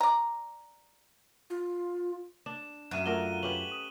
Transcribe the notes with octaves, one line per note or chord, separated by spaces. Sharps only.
D5 A#5
F4
D4 E7
F#2 E5 F#6 D#7 E7
A3 D4 F4 A#4 G7
C#4 G4 B4 F#7
D#6